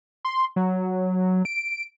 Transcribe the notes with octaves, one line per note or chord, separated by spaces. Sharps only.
C6
F#3
D7